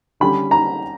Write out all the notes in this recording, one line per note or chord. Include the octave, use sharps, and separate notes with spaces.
D3 G3 C#4 B5
A#5